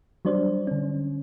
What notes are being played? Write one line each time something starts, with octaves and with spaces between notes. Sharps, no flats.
F#3 G3 D4 C5 D5
D3 C#4